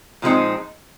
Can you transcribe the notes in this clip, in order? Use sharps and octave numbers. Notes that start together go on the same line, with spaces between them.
A#2 F3 G#3 C4 D#4